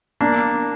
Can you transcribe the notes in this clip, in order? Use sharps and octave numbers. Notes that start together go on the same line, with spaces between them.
A#3 D4